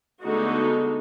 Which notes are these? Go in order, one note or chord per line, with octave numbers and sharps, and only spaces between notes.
D3 G#3 A3 B3 D#4 F#4